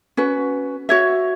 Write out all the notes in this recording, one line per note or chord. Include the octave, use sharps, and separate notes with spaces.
C#4 F#4 B4
F#4 C#5 E5